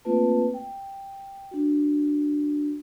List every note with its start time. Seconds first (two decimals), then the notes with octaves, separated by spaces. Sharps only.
0.05 A3 A#3 C4 F4 B4 A5
0.54 G5
1.51 D4 F#4